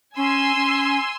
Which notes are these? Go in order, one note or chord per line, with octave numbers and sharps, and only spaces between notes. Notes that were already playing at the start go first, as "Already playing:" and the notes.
C#4 G#5 C6 E6
C#4